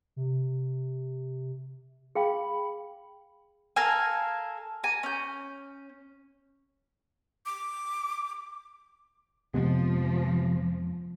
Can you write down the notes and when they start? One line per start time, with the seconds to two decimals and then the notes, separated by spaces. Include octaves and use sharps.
0.16 C3
2.15 G#4 F5 G5 B5
3.76 A4 A#4 F5 G#5
4.84 G#5 A#5
5.03 C#4 G6
7.46 D6
9.54 F2 C3 F3 G#3 B3